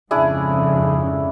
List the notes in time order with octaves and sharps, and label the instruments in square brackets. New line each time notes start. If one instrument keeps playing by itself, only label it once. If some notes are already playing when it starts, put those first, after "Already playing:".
[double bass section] F2 G#2 C#3 [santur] D4 E4 G#4